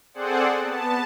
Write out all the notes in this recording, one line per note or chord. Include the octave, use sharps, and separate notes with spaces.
C4 G#4 A4 C5 D5 F#5
B3 A5